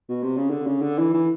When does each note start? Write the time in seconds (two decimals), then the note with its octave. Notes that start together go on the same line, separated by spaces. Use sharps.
0.09 B2
0.23 C3
0.37 C#3
0.50 D3
0.66 C#3
0.82 D3
0.98 E3
1.14 E3